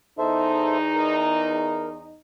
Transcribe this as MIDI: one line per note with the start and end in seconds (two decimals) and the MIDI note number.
0.19 2.17 40
0.19 2.17 63
0.19 0.78 69
0.19 0.78 72
0.19 0.78 76
0.94 1.89 70